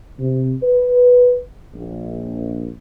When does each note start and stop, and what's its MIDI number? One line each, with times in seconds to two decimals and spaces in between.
0.19 0.54 48
0.63 1.38 71
1.74 2.69 34